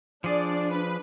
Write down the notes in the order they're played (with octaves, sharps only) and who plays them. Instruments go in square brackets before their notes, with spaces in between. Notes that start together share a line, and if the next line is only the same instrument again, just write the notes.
[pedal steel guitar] F3 G#4 [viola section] D4 [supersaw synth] D5
[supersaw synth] B4